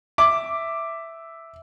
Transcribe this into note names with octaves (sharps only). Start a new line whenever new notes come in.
E5 D6